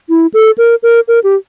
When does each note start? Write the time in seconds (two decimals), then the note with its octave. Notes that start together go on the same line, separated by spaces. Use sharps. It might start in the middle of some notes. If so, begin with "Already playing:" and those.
0.09 E4
0.34 A4
0.58 A#4
0.83 A#4
1.08 A#4
1.24 G4